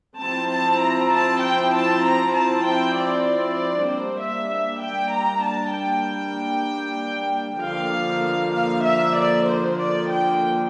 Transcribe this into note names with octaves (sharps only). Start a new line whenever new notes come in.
F3 C4 E4 A5
A5
A#5
A5
G5
A5
A#5
A5
G5
D5
G3 A#3 D4 C5
E5
E5
G5
A#5
A5
G5
D3 F3 A#3 F5
F5
E5
D5
C5
D5
G5